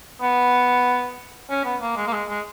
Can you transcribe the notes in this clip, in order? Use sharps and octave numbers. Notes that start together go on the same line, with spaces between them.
B3
C#4
B3
A#3
G#3
A#3
G#3
G#3